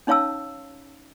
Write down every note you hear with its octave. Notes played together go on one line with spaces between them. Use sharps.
C#4 D#4 C#5 F5 A5 E6